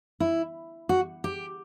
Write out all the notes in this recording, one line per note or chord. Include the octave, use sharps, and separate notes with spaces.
E4
F#4
G4